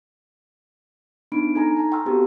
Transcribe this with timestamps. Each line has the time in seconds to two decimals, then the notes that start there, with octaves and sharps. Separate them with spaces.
1.32 B3 D4 D#4 B5 D7
1.55 D#4 A4 G#5 A#5
1.77 A5 A#5
1.92 G5 C6 C#6 E6 F6
2.06 B3 C4 F#4 G4 A4